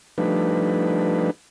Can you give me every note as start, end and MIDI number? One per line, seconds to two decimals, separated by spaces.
0.18 1.31 53
0.18 1.31 55
0.18 1.31 57
0.18 1.31 62
0.18 1.31 63
0.18 1.31 71